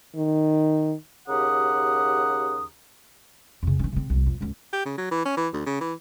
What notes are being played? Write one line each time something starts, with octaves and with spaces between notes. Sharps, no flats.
D#3
D#2 C#3 G4 F#5 A#5 D#6
F2 C#3
D#3 C#4
C#3 C4
C2 F2
F2
C#2 F#2
G4
C#3
F#3
E3
C#4
E3
D2
C#3
E3